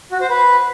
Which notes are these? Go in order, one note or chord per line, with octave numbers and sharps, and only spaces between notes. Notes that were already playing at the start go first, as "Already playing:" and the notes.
F#4
C5
B4